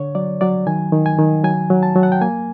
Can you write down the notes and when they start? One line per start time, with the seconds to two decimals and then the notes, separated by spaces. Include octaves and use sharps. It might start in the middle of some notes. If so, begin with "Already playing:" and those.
Already playing: D3 C#5
0.15 F#3 D5
0.41 F#3 D5
0.67 D#3 G#5
0.93 D#3
1.06 G#5
1.19 D#3
1.44 F#3 G#5
1.70 F#3
1.83 A5
1.96 F#3
2.03 F#5
2.12 G5
2.21 A#3 G#5